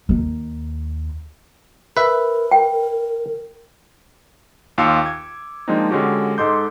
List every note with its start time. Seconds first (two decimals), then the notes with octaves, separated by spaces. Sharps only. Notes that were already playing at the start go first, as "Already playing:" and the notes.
0.09 D#2 D#4
1.97 A#4 B4 E5
2.51 G5
4.78 D#2 F4 F5 D6 E6 C#7
5.06 G#6
5.68 F3 G#3 A#3 C4 D4 D#4
5.91 D3 G#3 C#4 F#4 G4
6.38 G#2 A4 D#5 C6 D6 G6